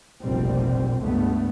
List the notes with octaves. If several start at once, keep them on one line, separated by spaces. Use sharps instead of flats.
F1 A#1 B2 G3 C4
C#2 G2 A3 B3